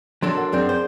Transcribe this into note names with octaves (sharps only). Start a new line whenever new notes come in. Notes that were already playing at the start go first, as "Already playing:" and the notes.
F#3 D4 A4 C6
A#4 F#5
F#2 C4 D4 G#4 D5 G6
C5